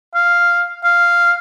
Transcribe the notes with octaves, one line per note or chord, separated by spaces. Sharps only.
F5
F5